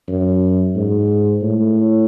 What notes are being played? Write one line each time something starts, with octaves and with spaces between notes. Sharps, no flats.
F#2
G#2
A2